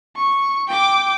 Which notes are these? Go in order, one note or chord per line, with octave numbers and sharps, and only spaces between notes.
C#6
G5 D6